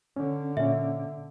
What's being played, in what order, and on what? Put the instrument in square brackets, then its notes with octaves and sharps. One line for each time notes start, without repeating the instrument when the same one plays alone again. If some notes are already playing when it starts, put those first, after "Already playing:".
[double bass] D3 [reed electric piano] C#4
[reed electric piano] A#2 C#4 [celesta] E5